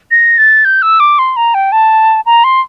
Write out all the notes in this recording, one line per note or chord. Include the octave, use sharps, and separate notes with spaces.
A#6
A6
G6
E6
D6
C6
A#5
G5
A5
A#5
C6